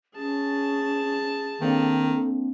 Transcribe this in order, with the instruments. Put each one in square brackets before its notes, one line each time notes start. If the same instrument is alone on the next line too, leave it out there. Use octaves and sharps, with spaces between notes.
[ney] C#4 [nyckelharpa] G#4 A5
[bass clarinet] D#3 [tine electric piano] A#3 C4 D4 [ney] A4